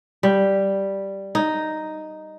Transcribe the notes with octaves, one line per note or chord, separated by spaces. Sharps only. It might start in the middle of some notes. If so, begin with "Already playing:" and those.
G3
D#4